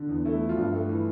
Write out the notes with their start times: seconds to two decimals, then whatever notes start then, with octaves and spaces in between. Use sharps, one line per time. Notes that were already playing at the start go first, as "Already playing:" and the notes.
Already playing: D3
0.09 E2
0.25 A3 E4
0.41 F3
0.49 F4
0.57 G2
0.73 A3
0.89 E3